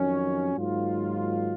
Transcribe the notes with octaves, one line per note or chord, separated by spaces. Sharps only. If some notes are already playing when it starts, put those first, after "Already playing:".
Already playing: F2 D#3 F#3 C#4
G#2 D#3 F#3 A#3 F4